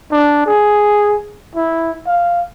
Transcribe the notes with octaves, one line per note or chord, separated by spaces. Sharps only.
D4
G#4
E4
F5